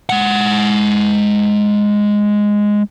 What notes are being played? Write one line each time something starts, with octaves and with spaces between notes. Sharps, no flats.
G#3 F#5